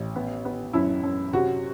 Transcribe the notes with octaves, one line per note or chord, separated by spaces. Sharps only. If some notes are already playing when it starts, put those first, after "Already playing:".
Already playing: A1
B3
B3
F#2 E4
F#2
C3 F#4